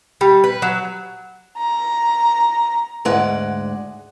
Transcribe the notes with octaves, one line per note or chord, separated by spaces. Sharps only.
G3
B4
F#3
A#5
D2 G#2 G#3 D5 F#5